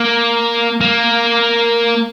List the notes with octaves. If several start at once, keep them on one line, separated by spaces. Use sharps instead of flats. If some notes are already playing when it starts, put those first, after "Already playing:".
Already playing: A#3
A#3